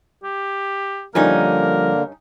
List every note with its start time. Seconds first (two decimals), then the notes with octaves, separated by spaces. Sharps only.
0.24 G4
1.15 G2 D3 F3 G3 A#3 C#4 D#4 A#4